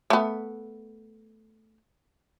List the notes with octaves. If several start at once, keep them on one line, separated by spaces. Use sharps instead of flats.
A3 B3